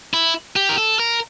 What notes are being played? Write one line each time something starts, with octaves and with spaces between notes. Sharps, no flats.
E4
G4
A#4
A4
A#4